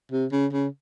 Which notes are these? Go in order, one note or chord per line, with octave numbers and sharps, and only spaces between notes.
C3
C#3
C#3